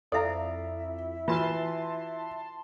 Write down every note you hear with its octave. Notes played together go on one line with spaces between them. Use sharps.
F2 E4 A4 D5 E5 F5 A#5
E3 F4 F#4 B4 A5 C6